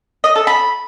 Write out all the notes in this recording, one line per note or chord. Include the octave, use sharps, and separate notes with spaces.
D#5
A4
B5